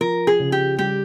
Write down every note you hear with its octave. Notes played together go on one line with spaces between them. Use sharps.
F3 A#4
G#4
C#3
G4
G3 G4